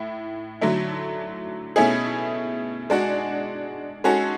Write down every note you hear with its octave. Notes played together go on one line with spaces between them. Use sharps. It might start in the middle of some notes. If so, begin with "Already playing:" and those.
Already playing: A2 E4
D3 F#3 A3 E4
B2 A3 C#4 E4 G#4
G#3 D4 F#4
G#3 C#4 F#4 A4